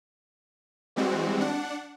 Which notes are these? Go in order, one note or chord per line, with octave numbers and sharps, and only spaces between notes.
E3 G3 G#3 C4 F#4
D4 F#5